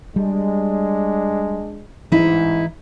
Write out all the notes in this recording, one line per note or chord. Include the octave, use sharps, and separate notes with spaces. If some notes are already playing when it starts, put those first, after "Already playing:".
G3 G#3 D4
A1 G#2 E3 D#4 E4